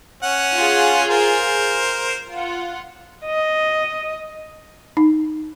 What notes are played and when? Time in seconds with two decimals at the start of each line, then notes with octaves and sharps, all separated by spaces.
0.23 C#4 F#5
0.55 F4 G#4
1.10 A#4 C5
2.28 F4 F#5
3.26 D#5
4.97 D#4